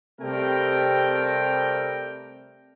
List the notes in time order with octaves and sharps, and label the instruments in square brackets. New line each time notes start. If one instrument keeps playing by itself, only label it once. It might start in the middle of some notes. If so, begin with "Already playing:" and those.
[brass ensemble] C3 G3 A3 C4 A#4 G5